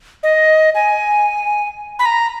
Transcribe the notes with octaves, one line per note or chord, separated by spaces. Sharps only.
D#5
G#5
B5
A#5